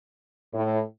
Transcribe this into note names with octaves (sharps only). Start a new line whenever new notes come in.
A2